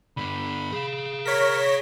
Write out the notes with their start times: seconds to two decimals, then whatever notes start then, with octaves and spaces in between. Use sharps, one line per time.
0.17 G2 D3 B5
0.72 G#4 F5
1.25 A#4 C#5 A#6 B6